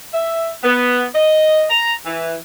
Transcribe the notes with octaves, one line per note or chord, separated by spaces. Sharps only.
E5
B3
D#5
A#5
E3